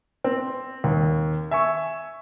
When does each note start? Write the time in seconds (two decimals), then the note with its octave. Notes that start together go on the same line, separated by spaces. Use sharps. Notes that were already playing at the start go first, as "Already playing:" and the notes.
0.24 C4
0.84 D#2
1.51 E5 G#5 C#6